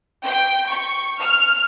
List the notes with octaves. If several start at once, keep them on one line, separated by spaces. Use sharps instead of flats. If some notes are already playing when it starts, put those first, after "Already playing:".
G5
C#6
F6